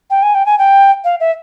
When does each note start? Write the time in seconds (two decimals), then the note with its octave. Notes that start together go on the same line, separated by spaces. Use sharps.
0.10 G5
0.23 G#5
0.35 G5
0.46 G#5
0.58 G5
1.04 F5
1.20 E5